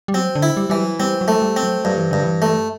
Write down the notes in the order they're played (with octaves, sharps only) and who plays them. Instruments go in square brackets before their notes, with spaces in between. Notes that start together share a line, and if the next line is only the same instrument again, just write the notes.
[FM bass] G3
[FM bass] F#3 [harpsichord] C4
[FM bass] D3
[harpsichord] E4
[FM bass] G3
[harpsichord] E3 [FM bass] G3
[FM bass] F#3
[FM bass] G3 [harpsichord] C4
[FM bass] F#3
[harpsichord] A3
[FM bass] G3
[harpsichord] C4
[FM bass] F#3
[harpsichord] G2 [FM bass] F#3
[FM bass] E3
[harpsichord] G2 [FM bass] D3
[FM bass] E3
[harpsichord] A3